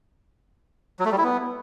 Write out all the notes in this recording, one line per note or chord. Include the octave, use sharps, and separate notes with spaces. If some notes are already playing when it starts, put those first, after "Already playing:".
F#3
A3
G3
E4
B3